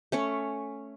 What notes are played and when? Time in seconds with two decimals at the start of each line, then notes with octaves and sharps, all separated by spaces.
0.12 A3 C#4 C#5